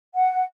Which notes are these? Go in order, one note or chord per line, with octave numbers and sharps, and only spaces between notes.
F#5